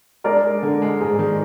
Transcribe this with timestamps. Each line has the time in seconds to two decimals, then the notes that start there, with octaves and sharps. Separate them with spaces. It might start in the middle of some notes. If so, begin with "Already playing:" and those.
0.24 G#3 A#4 D5
0.43 G#3
0.63 D3
0.82 G#3
1.01 G#2 G#4
1.19 D#3